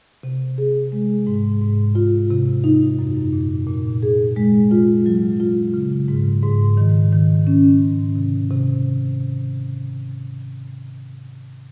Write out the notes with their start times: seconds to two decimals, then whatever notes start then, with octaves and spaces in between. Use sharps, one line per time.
0.23 C3
0.58 G#4
0.92 G#3
1.27 G#2
1.62 G#2
1.95 F4
2.30 C3
2.64 D#4
2.99 F#2
3.33 A#2
3.67 A#2
4.03 G#4
4.36 G#3
4.71 F4
5.06 F#3
5.40 F4
5.74 C#3
6.08 G#2
6.43 G#2
6.77 D#3
7.13 D#3
7.47 C#4
7.81 G#2
8.16 C3
8.50 C3